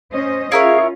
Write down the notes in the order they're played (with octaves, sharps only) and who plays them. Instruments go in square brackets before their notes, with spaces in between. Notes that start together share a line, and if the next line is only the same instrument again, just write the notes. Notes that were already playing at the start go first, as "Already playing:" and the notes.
[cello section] C#4 C5 D#5
[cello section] C#4 F4 [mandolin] E4 A#4 C#5 [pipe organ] G#4 F5